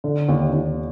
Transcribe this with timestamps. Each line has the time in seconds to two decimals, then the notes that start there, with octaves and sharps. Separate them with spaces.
0.04 D3
0.28 D#2
0.53 D#2